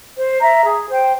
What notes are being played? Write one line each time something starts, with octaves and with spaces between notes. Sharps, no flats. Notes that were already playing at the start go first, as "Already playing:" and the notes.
C5
E5 A#5
G#4
C5 G5